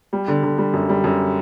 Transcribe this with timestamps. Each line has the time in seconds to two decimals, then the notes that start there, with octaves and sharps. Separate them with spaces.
0.13 G3
0.28 D3
0.43 D3
0.58 G3
0.73 F#2
0.89 G3
1.04 F#2